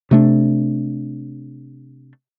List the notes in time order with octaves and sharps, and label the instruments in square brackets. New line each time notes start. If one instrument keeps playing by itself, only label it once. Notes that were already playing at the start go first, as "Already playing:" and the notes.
[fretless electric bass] C3 A3 D4